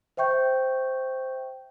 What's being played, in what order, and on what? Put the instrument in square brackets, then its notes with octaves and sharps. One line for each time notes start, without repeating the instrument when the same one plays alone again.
[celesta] C5 E5 G5 C#6 G6